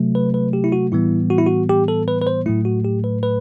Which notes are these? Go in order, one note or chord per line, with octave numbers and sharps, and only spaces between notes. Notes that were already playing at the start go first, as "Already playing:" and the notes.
Already playing: C3 F#3 A3
B4
B4
G4
E4
F#4
A2 E3 G3 B3 E4
F#4
E4
F#4
G4
A4
B4
B4
C5
A2 F#3 A3 E4
F#4
G4
B4
B4